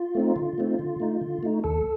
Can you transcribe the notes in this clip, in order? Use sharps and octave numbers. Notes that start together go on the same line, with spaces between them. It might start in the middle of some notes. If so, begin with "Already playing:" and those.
Already playing: F4
A3 C4 D#4
D3
A3 C4 D#4
D3
A3 D#4
D3
A3 D#4
D#2 A4